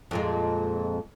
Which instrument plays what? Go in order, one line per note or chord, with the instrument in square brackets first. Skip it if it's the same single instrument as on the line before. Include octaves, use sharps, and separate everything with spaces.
[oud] F2 A#2 G#3